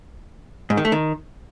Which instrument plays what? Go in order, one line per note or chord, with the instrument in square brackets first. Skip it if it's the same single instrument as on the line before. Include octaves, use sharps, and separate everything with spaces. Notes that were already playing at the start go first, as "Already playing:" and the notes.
[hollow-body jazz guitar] G#2
D#3
A3
D#3